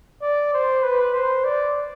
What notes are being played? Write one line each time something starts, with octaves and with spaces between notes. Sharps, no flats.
D5
C5
B4
C5
D5